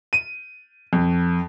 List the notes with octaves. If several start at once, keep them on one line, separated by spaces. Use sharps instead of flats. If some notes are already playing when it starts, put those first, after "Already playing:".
D#7
F2